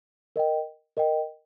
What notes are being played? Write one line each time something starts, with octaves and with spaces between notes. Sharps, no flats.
A#4 D#5 G5
A#4 D#5 G5